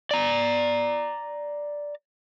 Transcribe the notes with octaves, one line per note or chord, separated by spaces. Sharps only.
D5 A#5